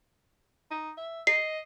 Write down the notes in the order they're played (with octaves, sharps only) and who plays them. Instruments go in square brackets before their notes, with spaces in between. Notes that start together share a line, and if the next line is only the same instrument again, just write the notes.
[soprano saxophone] D#4
E5
[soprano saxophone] D#5 [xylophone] C7